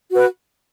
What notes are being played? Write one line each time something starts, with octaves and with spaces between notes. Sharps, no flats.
F#4 B4